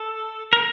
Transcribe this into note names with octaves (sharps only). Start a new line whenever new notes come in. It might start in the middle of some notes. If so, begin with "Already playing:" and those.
Already playing: A4
A#4